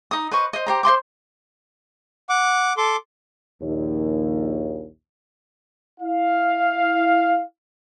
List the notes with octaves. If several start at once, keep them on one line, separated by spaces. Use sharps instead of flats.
D#4 D#6
B4 C5 D#5 C#6
C5 D#5
G4 C5 A#5
C5 D#5 C6 D6
F#5 D6
A4 C6 D6
A#1 D#2
E4 F5